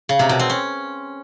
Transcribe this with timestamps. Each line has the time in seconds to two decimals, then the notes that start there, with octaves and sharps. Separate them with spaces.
0.09 C#3
0.19 C3
0.29 B2
0.39 C4
0.50 C#4